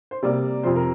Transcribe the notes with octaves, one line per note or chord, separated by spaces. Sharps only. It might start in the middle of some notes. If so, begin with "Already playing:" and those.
C5
C3 G3 A#3 D5
F2 C3 F3 C5
A#4